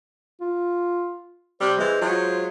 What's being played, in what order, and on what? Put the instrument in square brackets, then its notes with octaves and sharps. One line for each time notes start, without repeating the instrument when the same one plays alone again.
[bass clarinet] F4
[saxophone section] C3 G3 [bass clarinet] C5
[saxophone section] E3 G#3
F#3 G#3 F4